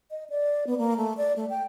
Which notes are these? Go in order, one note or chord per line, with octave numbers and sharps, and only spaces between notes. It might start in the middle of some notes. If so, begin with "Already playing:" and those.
D#5
D5
B3
A#3
A3
D5
A3
G5